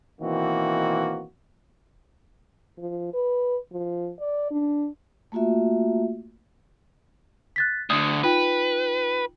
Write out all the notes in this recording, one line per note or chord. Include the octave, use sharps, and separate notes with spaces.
B2 D#3 E3 A#3 C4 F#4
F3
B4
F3
D5
D4
A3 A#3 F4 F#4 E5
F#6 A6 B6
D2 D3 D#6
D#4 F4 B4 G5